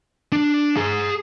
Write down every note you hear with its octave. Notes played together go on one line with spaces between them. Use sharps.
D4
G#4 A#5